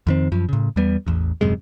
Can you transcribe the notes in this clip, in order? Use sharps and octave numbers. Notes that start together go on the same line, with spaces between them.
F2 D#3 C4
F#2 F3
A2 C#3
E2 G3 B3
A1 E2
D#1 F#2 C3 G#3